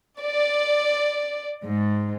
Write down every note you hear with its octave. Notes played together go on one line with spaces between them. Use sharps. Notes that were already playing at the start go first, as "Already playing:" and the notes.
D5
G#2